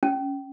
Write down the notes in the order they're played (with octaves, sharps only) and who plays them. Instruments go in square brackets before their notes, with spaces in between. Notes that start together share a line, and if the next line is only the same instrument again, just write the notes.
[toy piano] C#4